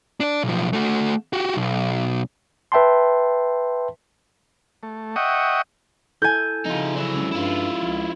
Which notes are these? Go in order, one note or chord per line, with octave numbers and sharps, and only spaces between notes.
D4 D5
B1 F3
A3 F#4
F#4 G4
B1
B4 E5 G5 A5 C6
A3
D#5 E5 F#5 G5 C#6 D#6
E4 A4 G#5 G6
C#3 F3 C4 D#4 F4
F#3 E4 D5
G#3 C#4
G2 E4 F4
C#2 F3